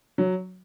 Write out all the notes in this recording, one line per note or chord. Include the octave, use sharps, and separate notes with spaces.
F#3